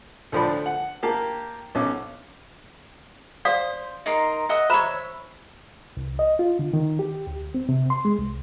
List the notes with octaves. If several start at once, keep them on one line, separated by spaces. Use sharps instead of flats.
D2 A2 F3 A3 D4 B5
F#5
A#3 G4 A5
B1 C#4 D6
C5 D5 F5 D#6
D#4 A#4 C6
D#5 E5 F#5
C5 C#5 E5 A#5 B5
C2
D#5
F4
D3
D#3
G4
D2
C4
C3
C6
G#3
C2